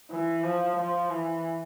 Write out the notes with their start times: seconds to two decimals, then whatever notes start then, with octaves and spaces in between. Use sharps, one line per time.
0.11 E3
0.44 F3
0.76 F3
1.10 E3